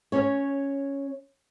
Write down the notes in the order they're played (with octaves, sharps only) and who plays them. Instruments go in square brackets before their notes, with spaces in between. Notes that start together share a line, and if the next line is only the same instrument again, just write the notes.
[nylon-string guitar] C#4 C#5